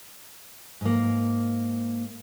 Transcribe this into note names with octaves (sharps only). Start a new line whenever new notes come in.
G#2 A#3